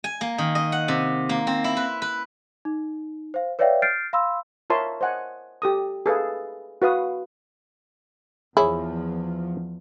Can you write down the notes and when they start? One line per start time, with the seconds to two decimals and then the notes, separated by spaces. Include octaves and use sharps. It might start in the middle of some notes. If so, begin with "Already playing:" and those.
0.04 G#5
0.21 A#3
0.38 D#3
0.55 D#5
0.72 F#5
0.88 C3
1.29 A#3
1.47 C4
1.64 E4
1.77 B4
2.02 B4
2.65 D#4
3.34 C5 F5
3.59 B4 C#5 D5 E5 F5 G5
3.82 F6 G6 A6 C7 D7
4.13 F5 B5 C6 E6
4.70 F4 A#4 C#5 E5 A5 C6
5.01 C5 D#5 F#5 G#5
5.62 G4 A4 D#6
6.06 G#4 A4 B4 F5
6.82 F#4 B4 F5 D#6
8.57 E2 F3 E4 G#4 C#5